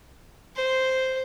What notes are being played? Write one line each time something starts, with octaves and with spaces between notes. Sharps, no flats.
C5